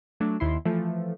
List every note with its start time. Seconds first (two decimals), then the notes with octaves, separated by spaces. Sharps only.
0.20 F#3 A3 D4
0.40 D#2 E4 C6
0.65 E3 F3 A3